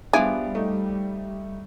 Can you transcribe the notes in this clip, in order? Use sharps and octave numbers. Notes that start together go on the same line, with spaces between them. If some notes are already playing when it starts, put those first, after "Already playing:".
F3 G3 B3 D4 G#4 E5 F5 D7
A3 D#4